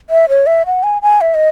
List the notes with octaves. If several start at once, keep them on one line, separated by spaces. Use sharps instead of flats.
E5
C#5
E5
F#5
G#5
G#5
E5
D#5